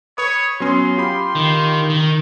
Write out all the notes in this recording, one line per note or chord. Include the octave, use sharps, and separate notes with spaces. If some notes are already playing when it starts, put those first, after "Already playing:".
B4 C#5 B5 D#6
F#3 B3 C#4 C6
F4 G4 B5
D#3
D#3